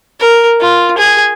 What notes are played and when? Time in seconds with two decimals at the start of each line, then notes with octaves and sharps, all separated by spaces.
0.20 A#4
0.60 F4
0.98 G#4